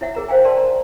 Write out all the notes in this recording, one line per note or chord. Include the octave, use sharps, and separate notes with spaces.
E4 C#5 E5 F#5
G#4 A#4 A#5
C5 F5 G5 G#5
A#4 D5 A5 C6
A#5